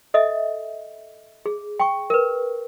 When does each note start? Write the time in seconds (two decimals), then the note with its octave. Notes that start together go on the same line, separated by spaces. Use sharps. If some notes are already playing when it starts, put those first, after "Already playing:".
0.14 A4 D#5 E5
1.46 G#4
1.80 G5 C#6
2.10 A#4 B4